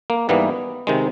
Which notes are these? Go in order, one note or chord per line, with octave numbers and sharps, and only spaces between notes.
A#3
G#2 E3 G3 A#3 B3
C3 D#3 G#3